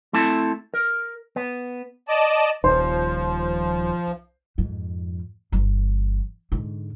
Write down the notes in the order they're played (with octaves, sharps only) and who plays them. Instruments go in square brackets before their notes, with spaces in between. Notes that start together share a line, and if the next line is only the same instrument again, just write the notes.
[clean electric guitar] A3 C4 E4 A4 A5
A#4
B3
[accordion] D5 D#5 A5
[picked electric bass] D#1 [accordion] F3 [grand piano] C5
[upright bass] F2 G#2
G1 E3
G#2 D3